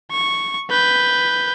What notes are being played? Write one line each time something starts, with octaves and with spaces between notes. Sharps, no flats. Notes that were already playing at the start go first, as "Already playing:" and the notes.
C#6
B4 G6